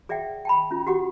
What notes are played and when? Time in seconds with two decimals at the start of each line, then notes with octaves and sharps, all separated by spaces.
0.09 G#4 D5 E5 F#5 G5
0.45 G5 A5 B5
0.71 C#4 F4
0.87 F#4 G4 F#5 D6